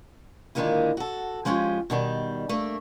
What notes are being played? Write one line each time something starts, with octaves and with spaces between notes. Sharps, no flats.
A#2 D3 D#3 G#3 A#3 E4
F#4 A4
F3 G#3 C#4 F4 G4
B2 D#3 G3
A3 A#3 D4